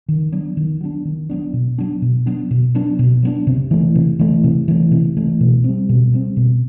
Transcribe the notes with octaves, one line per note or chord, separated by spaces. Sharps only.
D#3
F#3 B3 D4
D#3
F#3 B3 D4
D#3
F#3 B3 D4
B2
F#3 B3 D4
B2
F#3 B3 D4
B2
F#3 B3 D4
B2
F#3 B3 D4
C3
E3 A3
C3
E3 A3
C3
E3 A3
C3
E3 A3
B2
G3 C4
B2
G3 C4
B2